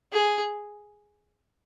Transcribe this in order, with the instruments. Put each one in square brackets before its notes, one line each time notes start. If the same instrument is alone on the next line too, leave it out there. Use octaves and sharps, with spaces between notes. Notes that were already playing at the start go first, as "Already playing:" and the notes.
[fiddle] G#4